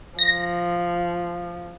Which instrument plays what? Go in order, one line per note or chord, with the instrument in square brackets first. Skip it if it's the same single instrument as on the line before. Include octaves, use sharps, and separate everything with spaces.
[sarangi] F3 [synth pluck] A#6